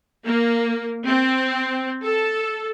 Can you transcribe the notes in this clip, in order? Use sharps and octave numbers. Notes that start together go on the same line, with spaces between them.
A#3
C4
A4